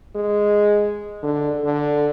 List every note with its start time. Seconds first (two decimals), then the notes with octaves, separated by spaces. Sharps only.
0.16 G#3
1.23 D3
1.65 D3